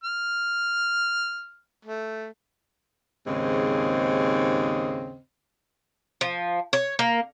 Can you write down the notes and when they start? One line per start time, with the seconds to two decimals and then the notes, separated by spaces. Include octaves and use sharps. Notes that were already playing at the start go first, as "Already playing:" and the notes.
0.04 F6
1.85 A3
3.27 D#2 G#2 C#3 C4 D#5
6.21 F3
6.73 C#5
6.99 A#3